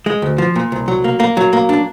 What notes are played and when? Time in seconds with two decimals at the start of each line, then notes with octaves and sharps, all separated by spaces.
0.06 G#3
0.22 D2
0.38 F3
0.55 A#2
0.72 C2
0.88 F#3
1.04 A#3
1.20 A#3
1.37 F#3
1.53 A#3
1.69 D4